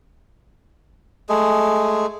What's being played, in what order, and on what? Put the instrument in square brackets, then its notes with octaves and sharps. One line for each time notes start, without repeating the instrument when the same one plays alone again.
[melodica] G#3 A3 G#4